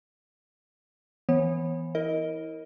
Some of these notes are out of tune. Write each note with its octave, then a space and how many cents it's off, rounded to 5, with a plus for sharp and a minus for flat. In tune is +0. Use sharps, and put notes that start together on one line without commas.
E3 +0 B3 +0 C#5 -30
E4 -30 A#4 +0 D#5 +15